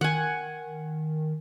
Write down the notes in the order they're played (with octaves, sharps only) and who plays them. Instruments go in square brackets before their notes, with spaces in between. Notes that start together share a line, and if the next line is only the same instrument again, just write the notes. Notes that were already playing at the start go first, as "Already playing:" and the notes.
[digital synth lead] D#3 [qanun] F#5 G#5